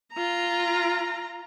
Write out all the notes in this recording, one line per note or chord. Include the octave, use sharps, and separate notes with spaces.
F4 A#5